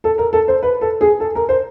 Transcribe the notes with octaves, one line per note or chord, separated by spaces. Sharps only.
A4
A#4
A4
C5
B4
A4
G#4
A4
A#4
C5